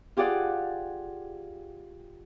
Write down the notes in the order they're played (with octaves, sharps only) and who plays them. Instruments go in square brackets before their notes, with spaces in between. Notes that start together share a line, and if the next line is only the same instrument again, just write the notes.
[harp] F4 G4 G#4 D5 F#5